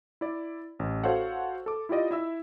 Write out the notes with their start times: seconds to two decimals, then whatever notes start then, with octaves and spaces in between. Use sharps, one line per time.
0.21 E4 D5
0.79 A1
1.04 F#4 A4 C5 C#5 F5 F#5
1.66 A4 D6
1.89 E4 F4 G4 D5 D#5
2.11 E4 E5 E6